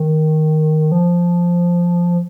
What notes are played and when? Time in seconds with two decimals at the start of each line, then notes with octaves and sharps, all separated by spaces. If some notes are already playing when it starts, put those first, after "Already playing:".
Already playing: D#3
0.92 F3